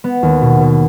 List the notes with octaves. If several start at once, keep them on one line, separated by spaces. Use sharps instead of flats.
B3
D#2
B2
B2